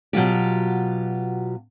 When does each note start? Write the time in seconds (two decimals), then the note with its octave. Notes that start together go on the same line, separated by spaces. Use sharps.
0.13 B2 F#3 F4 G4